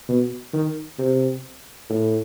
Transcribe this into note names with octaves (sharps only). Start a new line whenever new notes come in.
B2
D#3
C3
A2